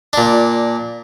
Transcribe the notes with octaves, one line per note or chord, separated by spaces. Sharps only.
A#2 D4